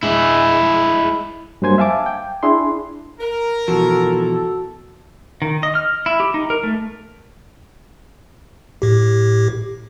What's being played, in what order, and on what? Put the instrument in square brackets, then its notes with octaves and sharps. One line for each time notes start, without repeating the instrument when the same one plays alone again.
[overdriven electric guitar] G#3 E4
[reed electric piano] G2 F#3 A#3 C5 G#5 G#6
E5 F5 G#5 A5 D6
G5
D4 E4 G#4 C6
[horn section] A#4
[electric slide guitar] B2 E3 F3 [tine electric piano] F#4 [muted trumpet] A4
[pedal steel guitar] D#3
D#5
F6
E4
G4
D#4
A#4
A3
[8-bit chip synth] A2 G4